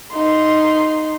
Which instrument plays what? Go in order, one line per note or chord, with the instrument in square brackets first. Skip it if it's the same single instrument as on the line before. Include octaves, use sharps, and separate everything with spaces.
[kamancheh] D#4 C6